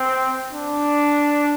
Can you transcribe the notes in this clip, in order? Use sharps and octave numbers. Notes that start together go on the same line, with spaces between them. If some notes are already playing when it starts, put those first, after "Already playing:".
Already playing: C4
D4